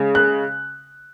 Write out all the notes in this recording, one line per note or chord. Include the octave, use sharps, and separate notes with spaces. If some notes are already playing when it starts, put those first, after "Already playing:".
Already playing: C#3 G#3
F#6